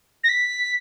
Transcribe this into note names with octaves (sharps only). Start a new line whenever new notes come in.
A#6
B6